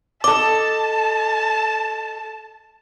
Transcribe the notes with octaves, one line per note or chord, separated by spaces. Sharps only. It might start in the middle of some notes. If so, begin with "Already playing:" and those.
A4 D#5 A5 D6